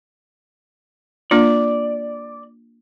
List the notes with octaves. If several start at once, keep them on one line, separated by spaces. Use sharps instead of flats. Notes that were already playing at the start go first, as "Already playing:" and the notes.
A#3 D4 F4 D5